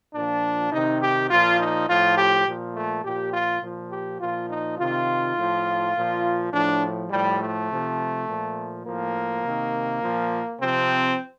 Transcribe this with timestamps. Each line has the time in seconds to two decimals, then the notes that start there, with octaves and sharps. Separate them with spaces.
0.14 A#2 F3 D4
0.72 C3 D#3 D#4
1.01 G4
1.30 A#2 F3 F4
1.59 D#4
1.88 A2 F3 F4
2.18 G4
2.46 A#2 F3
2.75 A3
3.04 A#2 F3 G4
3.33 F4
3.63 A#2 F3
3.91 G4
4.20 A#2 F3 F4
4.50 D#4
4.78 C3 D#3 F4
5.36 A2 F3
5.95 A#2 F3
6.52 A2 F3 D4
7.11 A2 F3 G3
7.40 A3
7.69 C3 F3
8.27 A#2 F3
8.85 A2 F3 A#3
9.43 C3 D#3
10.01 A#2 F3
10.59 C3 F3 C4